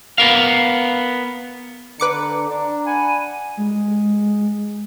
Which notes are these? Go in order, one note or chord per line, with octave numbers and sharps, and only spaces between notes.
B3 A#4 F5
D3 B4 A#5 D6 C#7
D4
F#5 G#5 B5
G#3